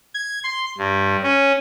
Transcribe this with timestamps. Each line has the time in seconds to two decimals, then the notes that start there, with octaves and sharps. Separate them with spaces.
0.14 G#6
0.44 C6
0.78 G2
1.23 C#4